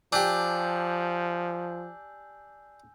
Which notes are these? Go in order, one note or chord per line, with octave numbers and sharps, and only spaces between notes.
F3 D4 G4 G#5 E6 G6